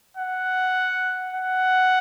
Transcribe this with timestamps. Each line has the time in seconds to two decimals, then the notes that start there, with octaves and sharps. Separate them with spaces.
0.17 F#5
1.33 F#5